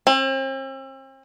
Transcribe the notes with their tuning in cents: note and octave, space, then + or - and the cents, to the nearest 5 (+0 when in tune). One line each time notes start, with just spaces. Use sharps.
C4 +40